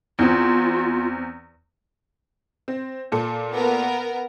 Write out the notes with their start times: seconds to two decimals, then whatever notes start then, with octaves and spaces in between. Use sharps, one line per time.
0.19 E2 C4 F4
2.68 C4
3.12 A#2 A4
3.51 B3 A#4